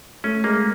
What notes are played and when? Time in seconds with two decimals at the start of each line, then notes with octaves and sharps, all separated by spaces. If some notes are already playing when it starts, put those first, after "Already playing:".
0.24 A3 C#4
0.44 G#3 A#3